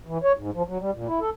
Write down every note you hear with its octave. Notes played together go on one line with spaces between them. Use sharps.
E3
C#5
G#2
F3
F#3
G3
A#2
E4
A4